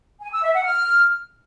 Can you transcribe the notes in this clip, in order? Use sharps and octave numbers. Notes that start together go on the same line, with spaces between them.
G#5
E6
E5
F#5
F6